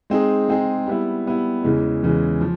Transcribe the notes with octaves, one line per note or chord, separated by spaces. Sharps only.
G#3 C4 D#4 G#4
G#3 C4 D#4 G#4
G3 B3 E4
G3 B3 E4
E2 C#3 E3 G#3
E2 C#3 E3 G#3
F3